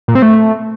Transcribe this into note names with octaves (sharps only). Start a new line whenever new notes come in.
A#2
C4
A3